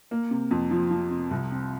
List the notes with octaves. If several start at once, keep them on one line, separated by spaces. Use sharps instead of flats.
A#3
C3
F2
F3
F3
C3
C2
C4